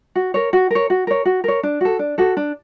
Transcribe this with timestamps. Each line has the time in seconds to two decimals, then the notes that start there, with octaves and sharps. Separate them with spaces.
0.15 F#4
0.34 A#4 C#5
0.53 F#4
0.71 A#4 C#5
0.90 F#4
1.07 A#4 C#5
1.25 F#4
1.44 A#4 C#5
1.63 D4
1.81 F#4 A4
1.99 D4
2.18 F#4 A4
2.37 D4